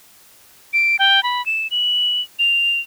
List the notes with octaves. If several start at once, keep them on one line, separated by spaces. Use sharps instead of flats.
D7
G5
B5
E7
F#7
F7